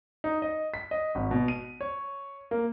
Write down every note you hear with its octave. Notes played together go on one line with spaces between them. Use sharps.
D#4
D#5
B6
D#5
G#1
B2
D#7
C#5
A#3